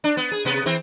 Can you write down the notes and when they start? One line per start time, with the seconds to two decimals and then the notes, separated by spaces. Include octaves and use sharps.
0.04 D4
0.17 B3
0.31 G#4
0.45 C3 B3
0.66 E3 C4